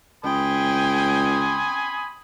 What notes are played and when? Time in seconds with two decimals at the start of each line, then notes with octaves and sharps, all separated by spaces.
0.25 C#2 G5 G#5 B5 C6 D#6